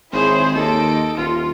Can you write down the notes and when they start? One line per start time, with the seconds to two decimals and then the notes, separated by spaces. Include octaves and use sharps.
0.12 G#1 E4 G#4 C5 C#5
0.55 D#2 A4 D#5 D7
1.17 D#1 F4